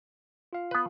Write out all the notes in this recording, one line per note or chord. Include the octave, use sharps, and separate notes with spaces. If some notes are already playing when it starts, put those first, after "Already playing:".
F4 F5
B3 B4